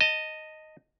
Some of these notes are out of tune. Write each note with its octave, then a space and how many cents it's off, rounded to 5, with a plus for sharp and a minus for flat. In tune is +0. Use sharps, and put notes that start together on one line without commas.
D#5 +0 A5 +30